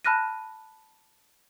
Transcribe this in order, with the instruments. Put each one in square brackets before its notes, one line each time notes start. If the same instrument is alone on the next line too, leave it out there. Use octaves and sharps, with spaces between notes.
[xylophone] A5 B5 F6 F#6 A#6 D#7